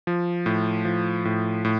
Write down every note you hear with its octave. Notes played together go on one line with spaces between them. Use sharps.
F3
A2
F3
A2
A2